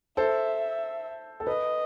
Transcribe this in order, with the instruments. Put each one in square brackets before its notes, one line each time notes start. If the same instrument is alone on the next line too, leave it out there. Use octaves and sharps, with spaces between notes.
[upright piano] A4 C5 [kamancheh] E5
[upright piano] A4
[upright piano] B4 [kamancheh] D#5